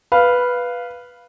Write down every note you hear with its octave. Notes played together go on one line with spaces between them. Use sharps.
B4 F5